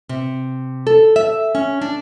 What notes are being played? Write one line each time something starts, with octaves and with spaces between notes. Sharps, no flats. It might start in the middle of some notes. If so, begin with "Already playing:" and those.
C3
A4
E5
C#4
D4